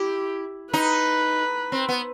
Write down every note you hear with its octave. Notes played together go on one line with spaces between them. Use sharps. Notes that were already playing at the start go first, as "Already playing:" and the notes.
Already playing: E4 G4
D#4 B4
C4
B3